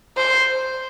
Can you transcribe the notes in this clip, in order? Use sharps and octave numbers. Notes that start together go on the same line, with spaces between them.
C5